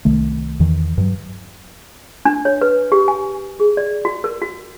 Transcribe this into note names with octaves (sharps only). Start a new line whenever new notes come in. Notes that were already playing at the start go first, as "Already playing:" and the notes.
C2 D#3 A3
E2 D#3 E3
G2 F#3
D4
C#5
B4
G4
G#5
G#4
D5
F#4
A#4
F#4